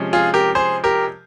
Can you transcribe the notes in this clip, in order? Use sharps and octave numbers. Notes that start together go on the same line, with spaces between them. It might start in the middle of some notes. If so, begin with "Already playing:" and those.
Already playing: C3 F3 G#3 C#4
F4 G#4
G4 A#4
G#4 C5
G4 A#4